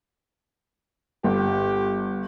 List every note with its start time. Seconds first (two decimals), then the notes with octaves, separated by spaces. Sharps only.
1.24 G1 G4